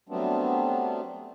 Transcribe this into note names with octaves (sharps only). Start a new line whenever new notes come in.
F#3 G3 A3 B3 C4 D4